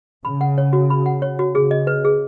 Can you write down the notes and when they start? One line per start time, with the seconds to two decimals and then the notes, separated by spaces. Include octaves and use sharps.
0.25 C#3 B5
0.41 F#5
0.58 C#5
0.73 F#4
0.90 B5
1.06 F#5
1.22 C#5
1.39 F#4
1.55 C#3 G#4
1.71 D#5
1.87 B4
2.05 G#4